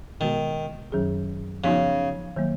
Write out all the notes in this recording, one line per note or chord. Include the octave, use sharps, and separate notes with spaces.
B2 D#3 G#3 B3 F#4 A#4
F#2 D#3 F#3 C#4 G#4
C#3 F3 B3 D#4 F#4
D#3 F#3 A#3